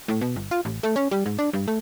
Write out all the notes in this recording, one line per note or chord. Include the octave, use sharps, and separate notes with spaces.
A2
B2
G1
F4
A1
A3
C#4
G3
G#2
D4
G2
A3